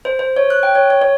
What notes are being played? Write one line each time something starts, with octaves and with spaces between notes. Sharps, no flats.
C5
C5
C#5
F#6
G5
C#5
C#5
C#5